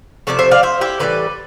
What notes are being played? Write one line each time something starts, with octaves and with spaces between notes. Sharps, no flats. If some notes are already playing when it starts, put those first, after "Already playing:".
C3 F3 A3 D5
C5 E5
D5 F5
C5 E5
E4 G4
A2 E3 G3 B4 D5